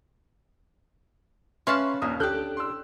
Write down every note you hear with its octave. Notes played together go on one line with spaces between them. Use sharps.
C#4 B4 E5 F5 A5 C6 C#6 F6
A#1 D#2 A#3 D#6
D2 D4 G4 A4 F#6 G6
C6 E6